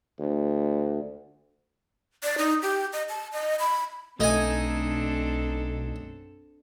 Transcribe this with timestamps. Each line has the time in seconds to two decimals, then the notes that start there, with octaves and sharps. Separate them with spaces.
0.19 D2
2.23 D5
2.38 D#4
2.62 G4
2.93 D#5
3.09 A5
3.32 D#5
3.60 B5
4.20 B1 A3 C4 D4 D#4 A4 G#5